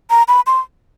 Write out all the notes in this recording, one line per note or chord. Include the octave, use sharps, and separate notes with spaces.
A#5
B5
C6